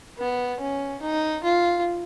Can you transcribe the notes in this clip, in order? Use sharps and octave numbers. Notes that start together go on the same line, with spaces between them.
B3
C#4
D#4
F4